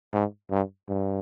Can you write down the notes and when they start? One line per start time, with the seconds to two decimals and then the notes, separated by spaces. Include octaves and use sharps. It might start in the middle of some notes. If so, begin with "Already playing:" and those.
0.13 G#2
0.50 G2
0.89 G2